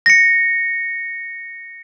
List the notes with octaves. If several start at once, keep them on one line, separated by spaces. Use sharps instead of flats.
A#6 C#7